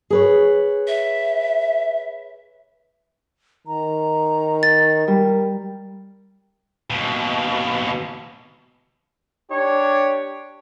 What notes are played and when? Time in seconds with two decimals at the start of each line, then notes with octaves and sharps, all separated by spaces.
0.10 G#4 B4 C#5
0.88 E5
3.67 D#3 A#5
4.63 A6
5.08 G3 A#4
6.90 D#2 B2
9.52 D4 G4 C#5